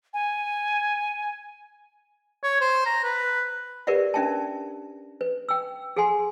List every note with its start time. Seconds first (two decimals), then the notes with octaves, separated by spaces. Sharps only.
0.14 G#5
2.43 C#5
2.61 C5
2.86 A#5
3.04 B4
3.87 G4 A#4 B4 D5 E5 F#5
4.14 C#4 D4 E5 G5 A5
5.21 B4
5.49 G5 E6
5.96 G#4 A4 F#5 G#5 C6